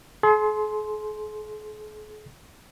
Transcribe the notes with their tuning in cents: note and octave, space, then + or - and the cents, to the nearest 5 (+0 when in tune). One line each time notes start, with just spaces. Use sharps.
G#4 +45 C6 +0